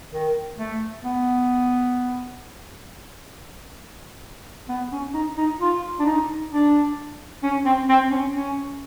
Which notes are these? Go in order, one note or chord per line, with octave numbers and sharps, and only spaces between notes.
D#3
A3
B3
B3
C#4
D#4
D#4
F4
D4
D#4
D4
C#4
C4
C4
C#4
C#4